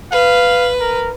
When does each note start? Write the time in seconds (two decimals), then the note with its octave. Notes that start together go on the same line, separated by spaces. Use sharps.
0.12 B4 F5
0.80 A#4